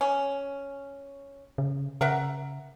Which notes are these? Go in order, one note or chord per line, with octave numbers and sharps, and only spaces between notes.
C#4
C#3
C#3 A#4 E5 F#5